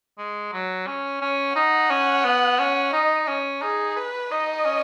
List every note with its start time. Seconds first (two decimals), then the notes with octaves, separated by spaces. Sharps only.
0.18 G#3
0.52 F#3
0.87 C#4
1.21 C#4
1.56 D#4 F#5
1.90 C#4
2.24 B3
2.59 C#4
2.93 D#4 D#5
3.28 C#4
3.62 D#4 G#4
3.96 B4
4.31 D#4 D#5
4.65 C#4